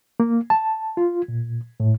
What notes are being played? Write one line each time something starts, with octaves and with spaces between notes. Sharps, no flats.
A#3
A5
F4
A#2
A2